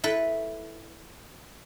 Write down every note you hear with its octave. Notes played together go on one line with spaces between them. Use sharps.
E4 A4 B4